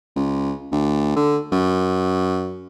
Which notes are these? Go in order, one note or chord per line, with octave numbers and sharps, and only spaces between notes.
C#2
D2
D3
F#2